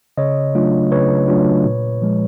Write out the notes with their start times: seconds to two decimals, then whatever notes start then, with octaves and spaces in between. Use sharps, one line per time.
0.17 C#3 C#5 D#5
0.55 F#3 A3 D4 F4
0.92 C#3 B4 C#5
1.28 F#3 A3 D4 F4
1.65 A#2
2.02 F3 G#3